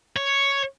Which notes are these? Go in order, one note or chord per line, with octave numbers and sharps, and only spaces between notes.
C#5